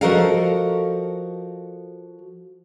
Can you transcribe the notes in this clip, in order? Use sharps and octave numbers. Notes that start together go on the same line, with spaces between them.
F3 F#4 A4 A#4 D#5 F5